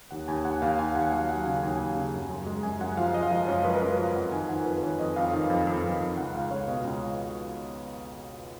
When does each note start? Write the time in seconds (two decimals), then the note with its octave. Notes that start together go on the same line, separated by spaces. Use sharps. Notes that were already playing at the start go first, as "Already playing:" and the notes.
0.11 D#2 F#5
0.28 D#2 G#5
0.45 D#2 F#5
0.62 D#2 F5
0.79 D#2 G#5
0.95 D#2 F#5
1.12 F#3 F5
1.29 F#3 F#5
1.46 C#3 G#5
1.60 D#2 F#5
1.73 G#5
1.80 D#2
1.97 C#3
2.13 F#2
2.30 F#2
2.46 G#3
2.63 F#2 G#5
2.81 F#2 F#5
2.97 F3 F5
3.14 F3 D#5
3.23 F5
3.31 F3 D#5
3.48 F#2 C#5
3.65 F3 B4
3.74 A#4
3.82 F#2 B4
3.98 F3 F5
4.15 F2 F#5
4.32 D#3 G#5
4.49 D#3 F#5
4.66 F2 B4
4.83 D#3 C#5
4.99 F2 D#5
5.16 F2 F5
5.33 D#3
5.50 F2
5.67 F2
5.84 F2
6.01 F2
6.17 C#2 F#5
6.34 C#2 F5
6.51 C#2 C#5
6.68 B2 D#5
6.85 C#2
7.01 C#2